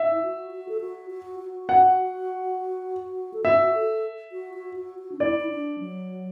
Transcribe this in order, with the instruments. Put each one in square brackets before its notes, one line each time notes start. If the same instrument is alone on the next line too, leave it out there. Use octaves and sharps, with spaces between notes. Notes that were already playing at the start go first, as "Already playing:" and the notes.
Already playing: [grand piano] E5
[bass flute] E4
F#4
F#4
A4
F#4
F#4
F#4
[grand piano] F#5
[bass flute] A4
[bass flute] F#4 [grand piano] E5
[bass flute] A4
F#4
F#4
F#4
F#4
D4
[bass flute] E4 [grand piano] D5
[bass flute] E4
D4
F#3